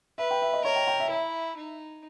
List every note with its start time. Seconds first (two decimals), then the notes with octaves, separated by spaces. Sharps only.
0.18 B4 E5
0.31 G5
0.42 E5
0.53 D#5
0.64 A#4 C#5
0.76 G5
0.88 G5
1.00 E5
1.10 E4
1.57 D#4